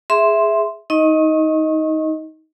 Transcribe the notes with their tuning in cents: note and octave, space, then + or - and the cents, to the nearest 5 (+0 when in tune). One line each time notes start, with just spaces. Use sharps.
G#4 +0 E5 +0 C6 +0
D#4 +20 D#5 +10 C#6 -30